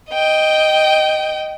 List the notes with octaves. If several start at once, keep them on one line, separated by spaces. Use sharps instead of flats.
D#5 G5